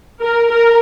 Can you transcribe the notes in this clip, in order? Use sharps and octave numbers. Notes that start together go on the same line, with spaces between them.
A#4
A#4